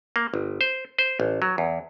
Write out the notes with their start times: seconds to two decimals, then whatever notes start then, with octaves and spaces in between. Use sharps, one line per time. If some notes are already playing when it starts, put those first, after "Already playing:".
0.16 A#3
0.34 G1
0.61 C5
0.98 C5
1.20 A1
1.42 F#3
1.58 E2